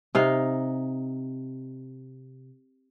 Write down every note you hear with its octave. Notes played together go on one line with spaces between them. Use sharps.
C3 D#4 F5